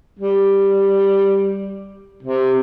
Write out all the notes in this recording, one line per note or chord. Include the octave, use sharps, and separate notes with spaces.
G3
C3